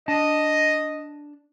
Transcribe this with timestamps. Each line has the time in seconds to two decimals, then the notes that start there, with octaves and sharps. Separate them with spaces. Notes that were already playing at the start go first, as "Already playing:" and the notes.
0.08 D4 D#5 A5